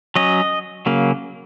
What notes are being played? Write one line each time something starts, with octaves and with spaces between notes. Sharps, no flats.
F#3 C#4 D#5
C#3 F#3 A#3